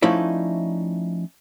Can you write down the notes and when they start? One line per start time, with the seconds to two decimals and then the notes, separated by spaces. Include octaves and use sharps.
0.02 F3 A3 C#4 D#4 E4 D5